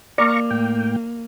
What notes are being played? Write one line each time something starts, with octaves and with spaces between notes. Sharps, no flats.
A#3 D5 F5 A#5 C#6
A2 G5